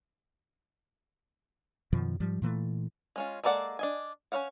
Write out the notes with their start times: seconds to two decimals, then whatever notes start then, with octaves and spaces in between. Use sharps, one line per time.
1.93 F#2 B2 D#3 F3
2.20 G#2 F3 G3
2.42 A#2 E3 G3 A3
3.16 G#3 C#4 F4
3.44 G#3 A#3 A4 D5 F#5
3.79 D4 D#5 G#5
4.32 C#4 D#4 C#5 F5 F#5